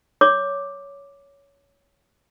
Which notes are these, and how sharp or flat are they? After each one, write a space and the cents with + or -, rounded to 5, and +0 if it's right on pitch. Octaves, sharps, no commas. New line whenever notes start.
C#5 +15 D6 +0